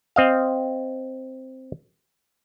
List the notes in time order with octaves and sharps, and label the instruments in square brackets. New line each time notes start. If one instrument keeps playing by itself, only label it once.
[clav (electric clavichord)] C4 D#5 F5